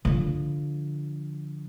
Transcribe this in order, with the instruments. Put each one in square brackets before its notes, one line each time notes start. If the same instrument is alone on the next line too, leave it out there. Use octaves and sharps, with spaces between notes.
[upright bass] D3 F3